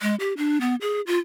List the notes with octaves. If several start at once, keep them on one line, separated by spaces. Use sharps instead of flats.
G#3
G4
D4
B3
G#4
F4